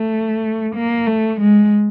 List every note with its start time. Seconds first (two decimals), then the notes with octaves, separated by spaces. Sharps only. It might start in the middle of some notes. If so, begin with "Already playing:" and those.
Already playing: A3
0.75 A#3
1.07 A3
1.40 G#3